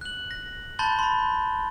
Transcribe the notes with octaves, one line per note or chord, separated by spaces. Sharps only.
F#6 F#7
A#6
A5 B5 C6 G6 A6 G7
B5 C6